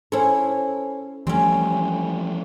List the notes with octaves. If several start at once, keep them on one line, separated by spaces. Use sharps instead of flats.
C#4 E4 A4 C5 C#5
E3 F3 G3 A3 C4 C#4